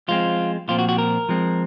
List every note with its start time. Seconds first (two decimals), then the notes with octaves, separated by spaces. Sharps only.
0.08 F3 G#3 C4 F4
0.68 A#2 F3 C4 F4
0.79 F#4
0.89 F#4
0.98 A#4
1.29 F3 G#3 C4